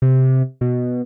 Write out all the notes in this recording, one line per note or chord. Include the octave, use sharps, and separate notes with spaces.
C3
B2